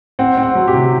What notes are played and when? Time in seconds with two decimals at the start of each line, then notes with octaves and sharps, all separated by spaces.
0.19 C4 F#5
0.38 C4
0.43 F#5
0.55 F#3
0.68 G4
0.73 C3